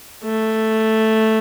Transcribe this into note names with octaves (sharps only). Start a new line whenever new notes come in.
A3